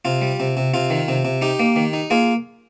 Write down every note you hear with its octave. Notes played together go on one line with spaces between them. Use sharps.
C3 F4
G3
C3
C3
C3 F4
D#3
C3
C3
D#4 G4
A#3
D#3
D#4
A#3 F4 G#4